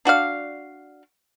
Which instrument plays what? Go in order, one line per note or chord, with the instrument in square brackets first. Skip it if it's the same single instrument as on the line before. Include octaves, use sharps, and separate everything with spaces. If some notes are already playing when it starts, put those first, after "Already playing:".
[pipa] D4 F#4 D5 F5